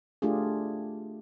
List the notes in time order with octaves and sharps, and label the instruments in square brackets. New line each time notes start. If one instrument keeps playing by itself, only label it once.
[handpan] A3 D4 F4 G4 G#4